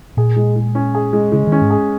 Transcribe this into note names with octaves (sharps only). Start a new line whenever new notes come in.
A#2 G#4
G#3
G#3
C#4
G#4
G#3
C#3 G#3
D#3
C#4
G#2
G#4